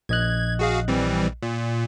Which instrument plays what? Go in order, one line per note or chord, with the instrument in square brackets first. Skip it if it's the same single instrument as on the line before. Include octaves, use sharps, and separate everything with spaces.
[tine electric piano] A#1 D#5 F#6 [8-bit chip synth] G#6
[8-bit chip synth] F#4 G#4 F5
E3 G3 C4
A#2